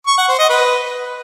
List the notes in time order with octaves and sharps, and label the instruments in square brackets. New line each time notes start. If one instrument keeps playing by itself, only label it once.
[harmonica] C#6
F#5
C5
D#5
B4